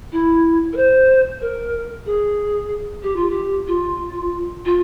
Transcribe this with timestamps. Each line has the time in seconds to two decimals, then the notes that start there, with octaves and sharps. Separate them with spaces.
0.12 E4
0.73 A#4
0.77 C5
1.41 A#4
2.06 G#4
3.03 G4
3.16 F4
3.30 G4
3.67 F4
4.65 F4